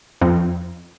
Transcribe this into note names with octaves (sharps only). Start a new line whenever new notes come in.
F2